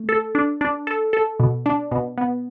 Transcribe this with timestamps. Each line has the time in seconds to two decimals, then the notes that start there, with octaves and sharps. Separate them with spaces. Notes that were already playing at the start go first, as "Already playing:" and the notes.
Already playing: A3
0.09 A4
0.35 D4
0.61 D4
0.87 A4
1.13 A4
1.40 B2
1.66 D4
1.91 B2
2.17 B3